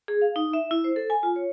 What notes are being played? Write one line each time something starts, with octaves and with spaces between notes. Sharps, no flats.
G#4
F5
D#4
E5
E4
C5
A4
G#5
F4
C#5